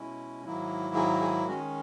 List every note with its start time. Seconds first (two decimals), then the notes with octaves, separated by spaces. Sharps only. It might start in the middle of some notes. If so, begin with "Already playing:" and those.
Already playing: B2 G#3 C#4 E4
0.45 G#2 D#3 F#3 A#3 E4
0.95 G#4
1.21 G#4
1.46 D#3 G#3 C#4 F#4